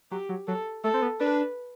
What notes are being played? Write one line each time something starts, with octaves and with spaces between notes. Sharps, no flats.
F#3 G4
F#3
F#3 A4
A3 A4
C4
B3
D4 B4